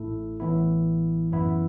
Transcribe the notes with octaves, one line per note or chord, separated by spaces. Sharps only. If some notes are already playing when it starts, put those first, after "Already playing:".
Already playing: A1 A2 A3 E4 A4
A1 A2 E3 B3 E4
F#2 E3 B3 E4